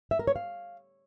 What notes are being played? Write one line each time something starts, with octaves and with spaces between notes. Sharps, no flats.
E5
A#4
C#5
F5